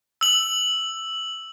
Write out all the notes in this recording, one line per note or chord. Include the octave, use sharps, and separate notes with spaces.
E6 F#7